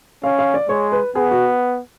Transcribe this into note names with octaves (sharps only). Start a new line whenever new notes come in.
C#4 F5
F5
D5
G#3 C#5
B4
B3 G#4
F#4